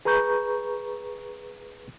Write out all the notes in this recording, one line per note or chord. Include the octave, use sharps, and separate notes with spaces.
G#4 B4 A#5 C#6 G6